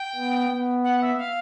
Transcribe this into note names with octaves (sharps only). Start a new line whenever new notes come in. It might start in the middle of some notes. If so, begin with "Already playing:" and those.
Already playing: G5
B3
B3
F#5
E5
F5